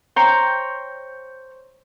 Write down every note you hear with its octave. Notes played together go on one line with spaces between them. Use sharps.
C5 C#5 G5 A#5